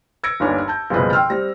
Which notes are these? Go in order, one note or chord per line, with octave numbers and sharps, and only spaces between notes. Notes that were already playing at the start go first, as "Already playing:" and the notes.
E6 G#6 A#6 C#7 D7
G1 D#2 D4 C#5 G#5
A5 G6
F#1 C2 B2 F3 G#4 B4
G5 C6 E6 F6
G3 C4 A#6